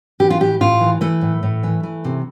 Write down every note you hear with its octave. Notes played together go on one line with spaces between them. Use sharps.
E3 G4
F4
A2 G4
A2 F4
E3
E3 A3
A2
A2
E3
E3
C3